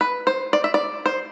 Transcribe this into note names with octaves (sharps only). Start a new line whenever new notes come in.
B4
C5
D5
E5
D5
C5